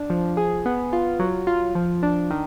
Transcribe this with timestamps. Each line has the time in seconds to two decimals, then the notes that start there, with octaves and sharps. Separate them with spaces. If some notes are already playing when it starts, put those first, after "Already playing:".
Already playing: D4
0.10 F3
0.37 G#4
0.66 B3
0.93 F4
1.19 F#3
1.47 F4
1.75 F3
2.03 D4
2.30 D#3